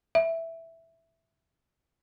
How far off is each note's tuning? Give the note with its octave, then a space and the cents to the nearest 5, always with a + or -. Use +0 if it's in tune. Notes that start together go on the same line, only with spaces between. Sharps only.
E5 +0